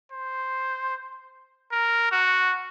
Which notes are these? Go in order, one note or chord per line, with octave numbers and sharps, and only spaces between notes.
C5
A#4
F#4